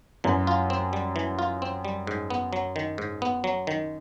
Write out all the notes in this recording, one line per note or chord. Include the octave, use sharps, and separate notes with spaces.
F#2 E3
F4
C4
G3
E3
F4
C4
G3
G#2
B3
F#3
D#3
G#2
B3
F#3
D#3